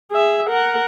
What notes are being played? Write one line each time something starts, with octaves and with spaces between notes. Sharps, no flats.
G#4 E5
A#4 F#5